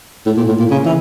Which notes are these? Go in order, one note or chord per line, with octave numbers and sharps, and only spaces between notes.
A2
A#2
A2
A#2
C#3
E3